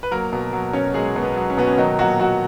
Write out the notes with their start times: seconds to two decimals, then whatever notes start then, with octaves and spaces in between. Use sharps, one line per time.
0.03 B4
0.11 F#3 A#3 A#4
0.33 B2
0.53 F#3
0.73 B2 C#4 C#5
0.94 F#3 G#3 G#4
1.16 B2
1.23 B3
1.36 F#3
1.50 C#4
1.58 B2 B3
1.67 C#4
1.78 D#3 F#3 D#4
1.99 A#2 F#3 F#4
2.19 F#3 F#4